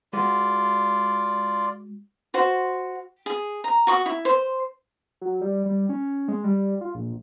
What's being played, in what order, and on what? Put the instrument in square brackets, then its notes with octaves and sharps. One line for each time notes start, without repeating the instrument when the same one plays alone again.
[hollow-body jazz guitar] G#3 F#4 B4 [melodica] F4 D5
[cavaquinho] F#4 C5
G#4
A#5
F#4 C#6 D#6
E4
C5
[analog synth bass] F#3
G3
G3
C#4
G#3
G3
F4
A#1